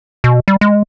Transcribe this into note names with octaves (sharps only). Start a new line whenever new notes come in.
B2
G3
G#3